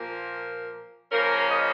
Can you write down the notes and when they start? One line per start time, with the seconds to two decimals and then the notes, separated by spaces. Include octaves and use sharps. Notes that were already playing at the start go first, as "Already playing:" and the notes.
Already playing: A#2 F3 A#3 A#4
1.11 C#3 F3 A#3 C#4 A#4
1.50 D#5